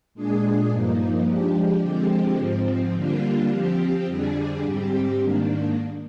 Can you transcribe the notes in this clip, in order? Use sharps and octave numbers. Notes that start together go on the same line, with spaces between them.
A#2 G#3 D4 G#4
G2 F3 A#3 D#4
F3 G#3 D4 G4
D3 F3 G#3 C4 G4
G#2 F3 C4
D3 G3 A#3 D4 F4
F3 C4 G4
F2 D3 G3 D4 G#4
G#2 G3 C4 G4
G#2 D#3 A#3 D4